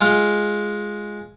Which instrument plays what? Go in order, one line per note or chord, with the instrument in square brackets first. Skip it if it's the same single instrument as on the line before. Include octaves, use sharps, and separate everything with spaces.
[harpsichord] G#3 F4